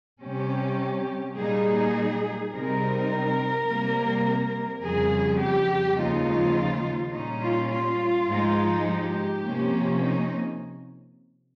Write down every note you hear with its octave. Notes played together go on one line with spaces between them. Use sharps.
C3 G3 C#4 G4
A#2 G3 A#3 D#4 G#4
C3 G3 C4 D#4 A#4
C3 G3 A#3
F2 C#3 G3 G#4
G4
D#2 C#3 F3 G#3 D#4 F4
A#2 G3 C#4 D#4
F4
F4
G#2 F3 G#3 D#4
G4
C3 F3 A#3 C#4
D#4